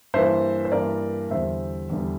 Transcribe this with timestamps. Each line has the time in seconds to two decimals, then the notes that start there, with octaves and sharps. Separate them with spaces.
0.14 G2 E3 A#3 C5 E5
0.65 C5
0.72 G2 E3 A#3 A#4 D5
1.31 E2 D3 G3 C5 E5
1.90 E2 D3 G3